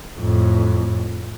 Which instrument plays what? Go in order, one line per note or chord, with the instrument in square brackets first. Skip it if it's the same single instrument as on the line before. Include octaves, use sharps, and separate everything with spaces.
[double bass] F2 A2